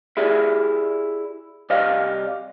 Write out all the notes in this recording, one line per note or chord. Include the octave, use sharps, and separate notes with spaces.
E4 G4 G#4 D5 E5
C2 G3 D5 D#5 F5